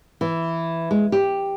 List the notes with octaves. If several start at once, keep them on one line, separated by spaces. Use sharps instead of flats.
E3
G#3
G4